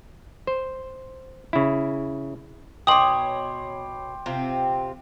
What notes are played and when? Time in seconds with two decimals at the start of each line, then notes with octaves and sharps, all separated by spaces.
0.47 C5
1.53 C#3 E4
2.87 B2 C#5 G5 C6 D6 D#6 F#7
4.26 C3 C4 F4